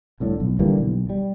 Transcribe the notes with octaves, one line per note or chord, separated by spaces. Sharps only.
C2 A2 D3
B1
D3 E3 G3 A#3
B1
G3